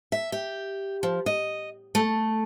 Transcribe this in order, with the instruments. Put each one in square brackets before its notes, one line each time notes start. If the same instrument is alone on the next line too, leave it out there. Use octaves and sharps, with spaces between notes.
[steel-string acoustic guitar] E5
G4
F3
D#5
A3